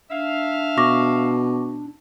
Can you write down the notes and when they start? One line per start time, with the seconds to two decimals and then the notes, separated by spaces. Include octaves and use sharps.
0.11 D4 E5 F5
0.78 B2 C#6 D6 A#6